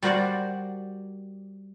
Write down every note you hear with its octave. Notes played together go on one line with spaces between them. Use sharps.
G3 F#4 A#4 C5 D5 F#5